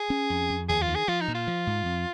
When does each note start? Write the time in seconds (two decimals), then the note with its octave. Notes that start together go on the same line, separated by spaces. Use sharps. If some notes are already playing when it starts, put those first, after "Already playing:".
Already playing: G#4
0.10 C#4
0.30 F2
0.50 F2
0.69 D#2 G#4
0.82 F4
0.88 D#3
0.95 G#4
1.08 F3 F4
1.21 D#4
1.28 A#2
1.35 F4
1.47 F3
1.67 G#2
1.86 F2